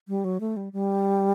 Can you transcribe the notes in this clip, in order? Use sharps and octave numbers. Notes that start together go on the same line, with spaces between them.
G3
F#3
A3
G3
G3